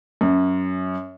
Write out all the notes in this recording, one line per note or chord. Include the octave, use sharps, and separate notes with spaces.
F#2